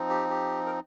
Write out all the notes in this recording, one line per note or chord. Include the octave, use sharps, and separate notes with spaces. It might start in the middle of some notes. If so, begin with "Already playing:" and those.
Already playing: F3 C4 D#4
G4
G4
A#4